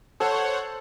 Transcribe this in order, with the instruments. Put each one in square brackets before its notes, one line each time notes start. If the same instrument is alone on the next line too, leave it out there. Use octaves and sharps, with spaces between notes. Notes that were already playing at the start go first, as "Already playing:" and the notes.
[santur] A4 [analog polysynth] C5 C#5 F#5